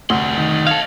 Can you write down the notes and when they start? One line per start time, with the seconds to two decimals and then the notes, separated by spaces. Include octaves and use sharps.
0.10 F1 D2 G3 C6
0.37 D#3
0.67 A4 C#5 D#5 F5